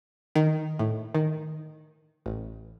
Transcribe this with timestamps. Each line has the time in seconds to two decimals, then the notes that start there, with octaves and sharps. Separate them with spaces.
0.36 D#3
0.79 A2
1.15 D#3
2.26 A1